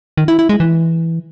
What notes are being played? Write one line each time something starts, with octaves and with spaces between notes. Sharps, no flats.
D#3
E4
E4
G#3
E3